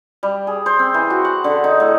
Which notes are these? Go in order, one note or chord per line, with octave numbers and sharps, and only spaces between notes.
G3
G#4
C5
C4
E3
F#4
F#5
D3
D#4
A2